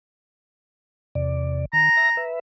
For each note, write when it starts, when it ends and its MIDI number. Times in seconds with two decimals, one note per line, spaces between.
1.15 1.65 40
1.15 1.65 48
1.15 1.65 74
1.73 1.89 51
1.73 2.25 82
1.97 2.10 76
1.97 2.10 94
2.17 2.39 71
2.17 2.39 76